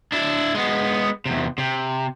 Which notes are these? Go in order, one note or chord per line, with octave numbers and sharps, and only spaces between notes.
D4 E4
G#3 B3
E2 C3
C3